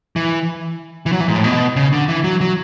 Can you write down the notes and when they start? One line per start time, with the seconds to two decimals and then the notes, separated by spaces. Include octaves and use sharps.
0.16 E3
1.06 E3
1.12 F#3
1.20 E3
1.28 G#2
1.36 A2
1.44 B2
1.76 C#3
1.92 D3
2.08 E3
2.24 F#3
2.41 F#3